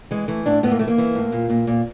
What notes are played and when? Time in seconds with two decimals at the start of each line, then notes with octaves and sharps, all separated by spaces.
0.11 E3 G#3
0.28 E3 A3
0.46 A2 D4
0.63 A2 B3
0.71 A#3
0.79 E3 A3
0.88 A#3
0.98 E3
1.15 A2
1.32 A#2
1.50 A#2
1.67 A#2